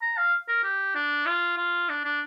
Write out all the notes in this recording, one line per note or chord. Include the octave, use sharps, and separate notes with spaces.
A#5
F5
A#4
G4
D4
F4
F4
D4
D4